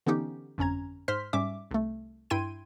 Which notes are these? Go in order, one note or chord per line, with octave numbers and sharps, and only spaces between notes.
D3 E3 B3 C#4 D#4 G4
G1 F2 C#4 A#5 G#6
G#2 C5 C6 F6 B6
G#2 G3 C#4 E5 D6
C2 A3
G2 E4 G5 C6 G#6 D#7